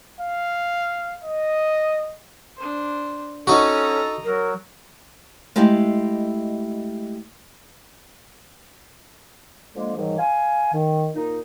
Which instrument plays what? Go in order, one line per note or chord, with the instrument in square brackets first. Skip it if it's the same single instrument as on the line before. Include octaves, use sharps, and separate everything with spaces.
[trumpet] F5
D#5
[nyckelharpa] D4 C5
[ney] C#4 [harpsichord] D#4 F#4 [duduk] A4 [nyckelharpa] D#5 A#5
[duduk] F#3 [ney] A#4
[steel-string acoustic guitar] G#3 A3 E4 G4 D#5 F5
[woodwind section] D3 F3 G#3 A#3
G#2 D#3 E3 F#3 G3
F5 G#5
D#3
A#2 D#4